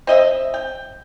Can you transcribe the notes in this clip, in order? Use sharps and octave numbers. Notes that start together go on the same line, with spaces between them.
C4 D#5 E5
G5